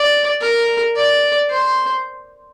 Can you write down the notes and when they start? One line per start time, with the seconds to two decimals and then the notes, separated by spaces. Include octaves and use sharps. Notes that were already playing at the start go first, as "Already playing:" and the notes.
Already playing: D5
0.41 A#4
0.96 D5
1.50 C5